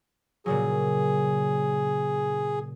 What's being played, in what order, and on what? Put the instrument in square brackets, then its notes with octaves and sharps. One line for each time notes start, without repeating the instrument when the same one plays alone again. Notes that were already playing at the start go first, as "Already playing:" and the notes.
[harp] A#2 C#3 F#3 [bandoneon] G#4